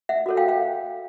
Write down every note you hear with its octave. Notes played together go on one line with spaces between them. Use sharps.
E5 F#5
F#4 A4 C#5
F5 G5
F5 G5